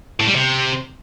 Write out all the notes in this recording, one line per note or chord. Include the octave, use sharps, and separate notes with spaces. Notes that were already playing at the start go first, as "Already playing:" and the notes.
A2
G3
C3